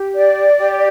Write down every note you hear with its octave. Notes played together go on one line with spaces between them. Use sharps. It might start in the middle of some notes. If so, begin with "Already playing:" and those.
Already playing: G4
D5
G4